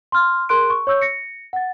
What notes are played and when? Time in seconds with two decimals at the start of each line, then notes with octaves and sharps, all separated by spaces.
0.12 C6 F6
0.49 G#4 A#4 C6 F#6 D7
0.70 C#6
0.87 C#5 C#6 E6 G6
1.02 A#6 C#7
1.53 F#5 A6